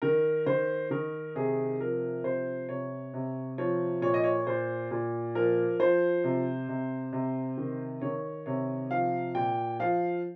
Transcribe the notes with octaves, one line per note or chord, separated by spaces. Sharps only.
D#3 A#4
D#3 C5
D#3 A#4
C3 G#4
F3 A#4
C3 C5
C3 C#5
C3
F3 C#5
A#2 C#5
D#5
C#5
A#2 C5
A#2
F3 A#4
F3 C5
C3
C3
C3
D#3
D#3 C#5
C3 C#5
F3 F5
A#2 G5
F3 F5